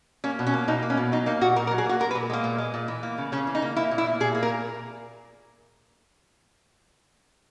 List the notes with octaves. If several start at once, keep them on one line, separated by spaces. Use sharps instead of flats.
A#3 C#4
B2
C#4
A#3
B2 D#4
A#3
C#4
B2
F#3 D#4
A#3 D#4
A#2 F#4
A#2 A#4
A#4
F#3
G#4
A#3 F#4
G#3 A#4
B4
A#2
G#3 A#3
A#2
G#3
A#2
E3
A#3
C#3
C#3 C#4
E3
D#4
A#3
A#3 E4
A#2
E4
A#3
A#2 G#4
A#3
A#4
A#2